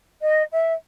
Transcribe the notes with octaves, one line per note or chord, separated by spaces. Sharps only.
D#5
E5